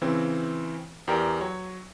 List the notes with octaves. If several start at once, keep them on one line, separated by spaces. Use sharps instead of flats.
C#3 E3 C4
E2 G4 A#4 D5
F#3 C#5